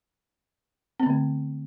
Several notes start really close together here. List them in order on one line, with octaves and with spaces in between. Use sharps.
C4 B3 D3 A3